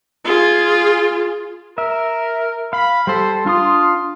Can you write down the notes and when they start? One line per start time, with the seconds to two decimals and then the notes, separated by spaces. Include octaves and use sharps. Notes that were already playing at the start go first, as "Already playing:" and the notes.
0.25 F4 G#4
1.78 A#4 E5
2.73 F5 B5
3.07 G3 A4 C5
3.46 D4 F4 C6 D#6